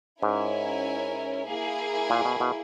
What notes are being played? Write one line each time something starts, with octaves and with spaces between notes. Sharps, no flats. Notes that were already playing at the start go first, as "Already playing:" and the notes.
G#2 C#4 E4 A#4 E5 G#5
A#3 E4 G#4
A#2
B2
B2